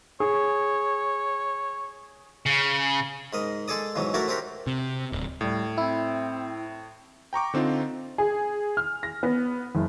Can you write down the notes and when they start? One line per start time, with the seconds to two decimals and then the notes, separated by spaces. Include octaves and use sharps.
0.20 G#4 C#5
2.46 C#3
3.33 G#2 A#4 D#5
3.68 G#3 G#4 A4 D5 D#6
3.95 E2 G#2 B2 E3 F#3
4.14 F#3 A3 E4 F#4 A#4 D5
4.28 C4 D4 F#4 G4 A#4
4.67 C3
5.12 D1
5.41 A2 G3
5.78 C4 E4
7.33 G5 A#5 C#6 D6
7.54 D3 C4 D#4 F4
8.18 G#4
8.77 F6
9.03 A#6
9.23 B3
9.75 F#1